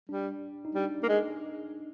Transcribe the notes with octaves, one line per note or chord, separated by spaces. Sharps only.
G3 D4
D#4
G3 D4
A#3
G#3